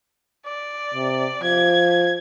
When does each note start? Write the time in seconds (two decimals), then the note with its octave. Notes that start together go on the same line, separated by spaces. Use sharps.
0.46 D5
0.94 C3
1.43 F3 G#6